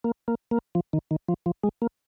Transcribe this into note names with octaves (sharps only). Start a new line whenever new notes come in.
A#3
A#3
A#3
F3
D#3
D#3
F3
F3
G#3
A#3